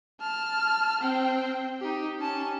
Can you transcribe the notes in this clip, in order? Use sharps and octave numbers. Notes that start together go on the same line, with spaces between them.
A5 F6
C4 G5
D#4 G4
C#4 A5